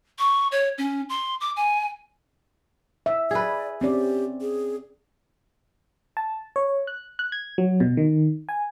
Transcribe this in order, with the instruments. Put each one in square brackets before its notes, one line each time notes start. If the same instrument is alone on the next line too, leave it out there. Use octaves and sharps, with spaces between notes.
[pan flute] C#6
C#5
C#4
C6
D6
G#5
[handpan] E5
[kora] G#4 B4 [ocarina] D5
[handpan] C4 C#4 D5 [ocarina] G4
[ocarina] G#4
[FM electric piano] A5
C#5
F#6
F#6
G#6
F#3
B2
D#3
G#5